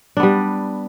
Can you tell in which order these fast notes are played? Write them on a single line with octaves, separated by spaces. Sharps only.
D4 B3 G3